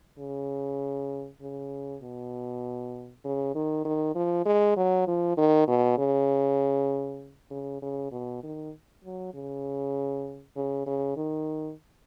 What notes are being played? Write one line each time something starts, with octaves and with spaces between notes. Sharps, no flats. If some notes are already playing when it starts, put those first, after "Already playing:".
C#3
C#3
B2
C#3
D#3
D#3
F3
G#3
F#3
F3
D#3
B2
C#3
C#3
C#3
B2
D#3
F#3
C#3
C#3
C#3
D#3